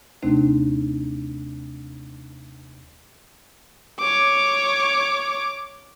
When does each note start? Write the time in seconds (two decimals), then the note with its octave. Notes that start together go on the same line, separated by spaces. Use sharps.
0.22 D#2 C3 A3 C4 D4 D#4
3.99 C#5 D6